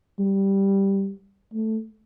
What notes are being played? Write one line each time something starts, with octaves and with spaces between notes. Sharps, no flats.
G3
A3